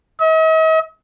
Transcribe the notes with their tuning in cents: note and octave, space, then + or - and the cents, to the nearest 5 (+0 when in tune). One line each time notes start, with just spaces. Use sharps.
D#5 +45